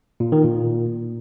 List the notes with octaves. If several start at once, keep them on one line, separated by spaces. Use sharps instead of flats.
A#2
D#3
A#2